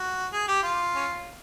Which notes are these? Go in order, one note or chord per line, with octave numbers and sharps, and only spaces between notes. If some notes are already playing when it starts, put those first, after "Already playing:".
Already playing: F#4
G#4
G4
F4
C#4